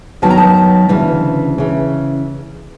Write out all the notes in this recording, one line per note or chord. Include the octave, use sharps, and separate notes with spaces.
F#2 D#3 F#3 B3 A5
A#5
A5
D2 C#3 E3
C#3 E3